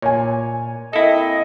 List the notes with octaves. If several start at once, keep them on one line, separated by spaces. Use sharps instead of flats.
A#2 C#5 G#5
A#3 C4 E4 A4 D#5